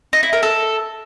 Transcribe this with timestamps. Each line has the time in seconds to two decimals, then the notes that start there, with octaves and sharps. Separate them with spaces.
0.13 D#4
0.23 E4
0.33 A#4
0.43 A4